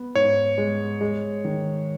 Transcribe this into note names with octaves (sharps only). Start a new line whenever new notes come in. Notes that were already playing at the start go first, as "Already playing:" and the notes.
Already playing: B3
G#2 C#5
G#3
G#3
D#3